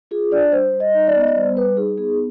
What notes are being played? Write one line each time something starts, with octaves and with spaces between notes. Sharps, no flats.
F4 G#4
D4 D5
G3 C5
G3
D#5
D#4
D5
B3
D#5
D5
G3 C5
G3 B4
D#4 G#4
B3 G#4